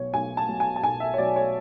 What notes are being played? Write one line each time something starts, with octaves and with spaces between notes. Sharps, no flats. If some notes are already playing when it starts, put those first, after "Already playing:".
Already playing: B1 B2 F#3 C#5
B1 G#5
A5
B2 F#3
G#5
A5
B1 G#5
E5
C#5
B2 F#3 D5
C#5